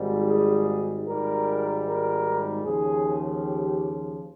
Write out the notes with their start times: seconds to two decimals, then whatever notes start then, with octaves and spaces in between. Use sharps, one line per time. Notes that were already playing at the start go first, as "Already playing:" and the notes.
Already playing: G#1 G#2 G3
0.30 G#4
1.08 G#1 G#2 G3 A#4
1.87 A#4
2.64 D#2 C#3 F3 G#4
3.44 G4